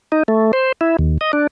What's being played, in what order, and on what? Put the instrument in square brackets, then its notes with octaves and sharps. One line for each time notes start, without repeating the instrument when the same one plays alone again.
[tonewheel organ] D#4
A3
C5
E4
D#2
D#5
D4